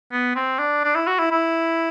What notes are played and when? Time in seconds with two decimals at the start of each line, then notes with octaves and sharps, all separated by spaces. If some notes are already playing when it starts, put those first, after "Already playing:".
0.12 B3
0.36 C4
0.59 D4
0.84 D4
0.95 E4
1.08 F#4
1.19 E4
1.31 E4